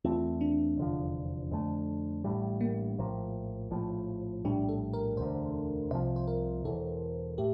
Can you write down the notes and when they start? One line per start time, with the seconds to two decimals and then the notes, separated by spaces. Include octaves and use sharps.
0.04 E2 E3 A3 C4 F4
0.41 D4
0.77 F1 E2 D3 F3
1.51 F2 D3 A3
2.24 A1 A2 G3
2.61 A#3
2.98 A#1 A2 F3 A#3
3.71 A#1 A2 F3
4.44 A#1 A2 G3 D4
4.69 A4
4.93 A#4
5.17 E1 D2 D3 C5
5.91 C2 C3 F3 C5
6.16 C5
6.27 A#4
6.64 E1 E2 E3 A4
7.38 A2 G4